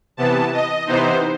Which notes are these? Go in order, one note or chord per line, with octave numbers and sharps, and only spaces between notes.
C3 E3 B3 A5
D#5
C3 E3 B3 D#4 C5